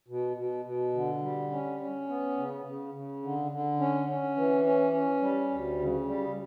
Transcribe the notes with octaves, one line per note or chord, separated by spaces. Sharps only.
B2
B2
B2
D3
G3
C#4
C#4
B3
C#3
C#3
C#3
D3
D3
C#4
C#4
E3
C#4
C#4
G3
D2
C#3
G3